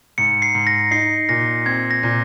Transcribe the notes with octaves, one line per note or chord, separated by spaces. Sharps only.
G#2 C#7
C7
G#2
A#6
D#4 C7
A#2 A#6
C4 G#6
A#6
A#2